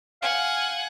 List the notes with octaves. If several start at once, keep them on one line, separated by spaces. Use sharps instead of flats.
F5 F#5 G#5